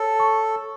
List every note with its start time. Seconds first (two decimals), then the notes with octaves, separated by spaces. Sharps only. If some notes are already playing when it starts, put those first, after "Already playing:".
Already playing: A4 C#5
0.20 A5 C#6